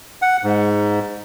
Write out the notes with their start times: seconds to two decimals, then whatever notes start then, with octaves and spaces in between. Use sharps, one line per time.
0.22 F#5
0.44 G#2